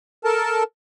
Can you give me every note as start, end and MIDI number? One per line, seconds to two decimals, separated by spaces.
0.24 0.63 69
0.24 0.63 70
0.24 0.63 81